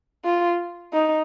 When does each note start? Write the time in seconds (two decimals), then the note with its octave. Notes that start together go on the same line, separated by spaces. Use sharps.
0.25 F4
0.93 D#4